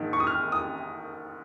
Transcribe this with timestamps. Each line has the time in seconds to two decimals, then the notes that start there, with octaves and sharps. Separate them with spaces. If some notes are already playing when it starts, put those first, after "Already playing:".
Already playing: A#1 G#2 D#3
0.13 C#6
0.20 D#6
0.27 F6
0.52 D#6